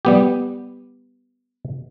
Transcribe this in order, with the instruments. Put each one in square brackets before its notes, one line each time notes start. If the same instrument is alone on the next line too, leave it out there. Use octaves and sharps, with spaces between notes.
[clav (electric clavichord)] G3 B3 G4